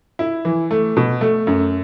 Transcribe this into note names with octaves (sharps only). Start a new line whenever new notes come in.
E4
E3
A3
B2
A3
F#2